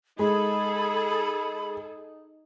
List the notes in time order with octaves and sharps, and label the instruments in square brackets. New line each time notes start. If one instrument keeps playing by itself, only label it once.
[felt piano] G#3 [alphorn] D#4 [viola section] G#4 A4 [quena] B5